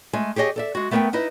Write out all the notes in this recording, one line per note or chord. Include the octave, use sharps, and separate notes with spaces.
G#3 A3 G#5
G4 G#4 C#5 D#5 G#5
A4 D5 E5
G#3 F#4
A3 B3 A#4 C#5 E5 G5
D#4 E4 B4 D#5